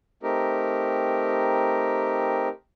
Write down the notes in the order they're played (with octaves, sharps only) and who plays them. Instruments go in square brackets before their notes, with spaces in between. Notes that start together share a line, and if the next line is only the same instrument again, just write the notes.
[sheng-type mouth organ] A3 C4 D#4 G4 A#4